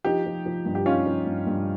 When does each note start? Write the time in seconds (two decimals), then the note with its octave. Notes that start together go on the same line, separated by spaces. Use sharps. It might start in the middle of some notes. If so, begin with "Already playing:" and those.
0.04 F3 D#4 G4
0.26 F3
0.46 F3
0.65 G2
0.75 G4
0.86 C#4 D#4 F4
1.06 F3
1.27 G2
1.47 G2